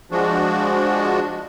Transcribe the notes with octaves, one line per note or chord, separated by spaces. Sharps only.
F3 G#3 D4 F#4